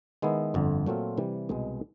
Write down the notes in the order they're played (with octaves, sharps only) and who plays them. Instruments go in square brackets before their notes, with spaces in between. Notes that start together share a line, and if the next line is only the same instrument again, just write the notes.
[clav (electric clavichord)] D#3 G#3 B3 E4
G1 F2 D3
A#2 F#3 A3 C4 F4
C3 E3 G3
C2 B2 G#3